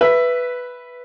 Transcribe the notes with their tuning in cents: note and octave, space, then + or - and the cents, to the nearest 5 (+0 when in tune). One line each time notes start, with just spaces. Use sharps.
B4 +0 E5 +10